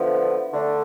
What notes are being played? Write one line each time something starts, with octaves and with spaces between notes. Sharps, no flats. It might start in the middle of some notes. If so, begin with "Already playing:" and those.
Already playing: D3 F3 B3 E4
D3 A3 D4